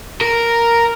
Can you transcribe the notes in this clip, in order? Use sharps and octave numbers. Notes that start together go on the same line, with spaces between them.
A#4